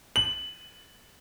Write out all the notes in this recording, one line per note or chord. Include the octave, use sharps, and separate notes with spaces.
F#7